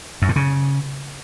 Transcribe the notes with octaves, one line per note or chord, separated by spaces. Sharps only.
F#2
A2
C#3